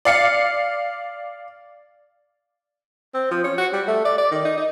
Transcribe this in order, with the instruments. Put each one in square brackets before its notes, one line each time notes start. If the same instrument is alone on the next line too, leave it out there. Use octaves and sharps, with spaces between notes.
[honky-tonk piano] D5 F5 C#7
[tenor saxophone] C4
F3
C#4
F#4
G3
A3
D5
D5
D#3
D#4
D#4